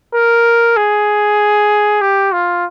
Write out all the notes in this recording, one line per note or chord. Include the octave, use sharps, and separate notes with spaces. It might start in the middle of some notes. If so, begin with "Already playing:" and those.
A#4
G#4
G4
F4